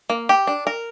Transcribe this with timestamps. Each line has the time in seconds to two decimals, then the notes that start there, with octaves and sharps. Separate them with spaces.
0.10 A#3
0.29 G4
0.47 D4
0.67 A#4